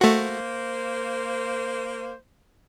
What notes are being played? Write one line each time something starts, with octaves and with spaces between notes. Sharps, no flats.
A3 A#3 F#4 C5